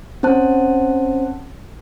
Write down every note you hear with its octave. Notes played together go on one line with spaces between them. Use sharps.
C4 C#4 C5 A5 F#6